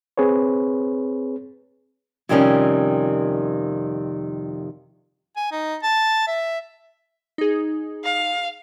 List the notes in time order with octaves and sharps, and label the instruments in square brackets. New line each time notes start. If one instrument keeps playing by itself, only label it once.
[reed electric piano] C4 G#4 B4 C#5
[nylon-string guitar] F2 C3 D#3 G3 C4 C#4
[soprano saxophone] G#5
D#4
A5
E5
[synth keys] D#4 G#4
[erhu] F5